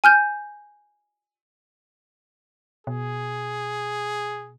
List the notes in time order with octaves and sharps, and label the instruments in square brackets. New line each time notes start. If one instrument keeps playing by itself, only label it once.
[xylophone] G#5 F6 G6
[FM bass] B2 [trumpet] G#4